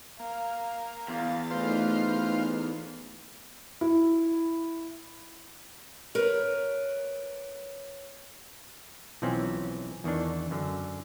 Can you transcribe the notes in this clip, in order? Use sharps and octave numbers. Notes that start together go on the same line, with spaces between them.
A#3 F5
E2 F5 A6
A3 D#4 F4 B4 C5 F6
E4
A#4 B4 C#5
B1 E3 F3 C4 C#4
E2 D#3 E3 D4
F#2 D3